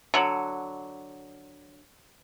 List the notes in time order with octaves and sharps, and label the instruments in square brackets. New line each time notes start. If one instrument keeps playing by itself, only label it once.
[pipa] D3 F#3